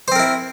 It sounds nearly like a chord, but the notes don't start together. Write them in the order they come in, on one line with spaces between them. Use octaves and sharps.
C5 C4 A#4 E4